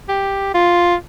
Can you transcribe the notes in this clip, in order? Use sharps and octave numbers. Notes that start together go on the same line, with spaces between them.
G4
F4